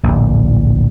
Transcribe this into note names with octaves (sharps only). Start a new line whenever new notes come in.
D1 A#1